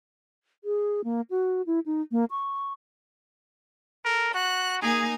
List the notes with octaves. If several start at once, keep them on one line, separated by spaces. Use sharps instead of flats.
G#4
A#3
F#4
E4
D#4
A#3
C#6
A4 A#4
F#4 F#6
A#3 D#4 G#4 G#5